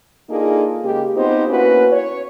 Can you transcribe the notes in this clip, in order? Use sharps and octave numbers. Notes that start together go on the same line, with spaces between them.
A#3 D4 D#4 F4 G#4 A4
C#3 G#3 A#3 G4
B3 C4 D#4 F4 G4 C5
A#3 B3 C#4 E4 F#4 B4
C#5